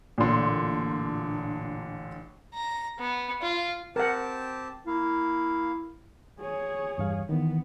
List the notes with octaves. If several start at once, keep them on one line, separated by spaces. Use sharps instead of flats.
A1 A#2 D3 D4 C6
A#5
B3
F4
C4 G4 A#4 F#5 A5
A#3 E4 F5
G#4 C#5
E2 G2 F5
D#3 E3 B3